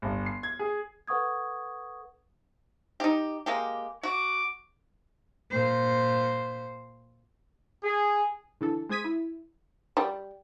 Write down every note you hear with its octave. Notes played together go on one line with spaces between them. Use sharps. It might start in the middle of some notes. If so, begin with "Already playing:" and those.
G1
C7
G#6
G#4
A4 B4 F#5 C#6 D#6 G#6
D#4 G4
G#3 A#3 G4
F#4 D6
A#2 C5
G#4
D3 E3 A4
G#3 C5 D#6 G#6 B6 D#7
E4
G3